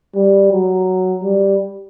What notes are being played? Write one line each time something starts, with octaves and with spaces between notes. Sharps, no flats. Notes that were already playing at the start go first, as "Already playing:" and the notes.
G3
F#3
G3